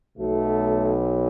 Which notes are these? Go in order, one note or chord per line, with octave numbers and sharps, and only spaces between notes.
B1 B2 F#3 A3